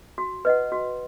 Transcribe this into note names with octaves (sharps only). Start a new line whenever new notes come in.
F#4
B4 D#5 F#5
F#4